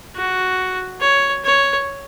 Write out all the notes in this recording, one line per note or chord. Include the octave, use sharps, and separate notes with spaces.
F#4
C#5
C#5